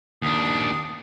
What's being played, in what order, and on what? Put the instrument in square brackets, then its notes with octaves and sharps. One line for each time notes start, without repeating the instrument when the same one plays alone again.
[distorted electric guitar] D#2 D4 [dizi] D#6